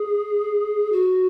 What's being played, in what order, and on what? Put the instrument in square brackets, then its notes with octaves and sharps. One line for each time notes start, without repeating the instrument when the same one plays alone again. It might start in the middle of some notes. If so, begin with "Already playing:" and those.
Already playing: [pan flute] G#4
F#4